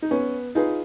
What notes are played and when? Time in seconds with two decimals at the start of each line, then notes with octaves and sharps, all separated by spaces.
0.02 D#4
0.11 B3 C#4
0.55 D#4 F4 G#4 B4